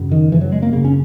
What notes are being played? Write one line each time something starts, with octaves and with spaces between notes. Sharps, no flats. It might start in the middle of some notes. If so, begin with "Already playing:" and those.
Already playing: F#2 C#3
D#3
F#2 C#3 E3
F#3
G#3
A#3
F#2 C#3 A#3
C#4